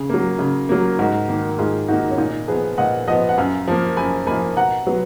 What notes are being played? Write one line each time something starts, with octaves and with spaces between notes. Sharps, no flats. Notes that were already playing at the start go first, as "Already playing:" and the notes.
Already playing: C#3 G#4
F#3 A#3
C#3
F#3 A#3
G#2 F#4 A#4
D#3 A#3
G#2 F4 G#4
D#3 A#3 D#4 F#4
C#4
A#2 D#4
F3 B3 G#4 B4
A#2 D#5 F#5
F3 B3 D#5 F#5
F#5
F#2 F5 G#5
F3 A#3
F#2 G#5 B5
F3 A#3 G#5 B5
B2 F#5 A#5
F#3 B3